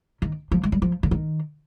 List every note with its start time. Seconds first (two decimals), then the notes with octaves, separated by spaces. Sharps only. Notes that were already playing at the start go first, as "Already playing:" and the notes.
0.22 D#3
0.52 F3
0.63 G#3
0.72 G3
0.82 F3
1.03 D3
1.11 D#3